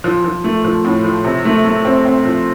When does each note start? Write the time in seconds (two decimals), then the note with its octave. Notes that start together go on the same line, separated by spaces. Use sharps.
0.04 F3
0.24 F3
0.44 A3
0.64 F3
0.85 A2
1.05 F3
1.25 C3
1.45 A3
1.65 A3
1.85 C4
2.05 C4
2.25 F3